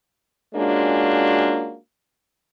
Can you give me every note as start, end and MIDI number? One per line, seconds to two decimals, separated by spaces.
0.55 1.76 56
0.55 1.76 58
0.55 1.76 61
0.55 1.76 62
0.55 1.76 65
0.55 1.76 66